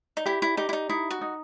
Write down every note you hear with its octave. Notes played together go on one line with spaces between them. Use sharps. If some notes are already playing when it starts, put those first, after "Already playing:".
D#4
E4 G4
E4
D#4 G4
E4
D#4
D#4 E4
F#4
D#4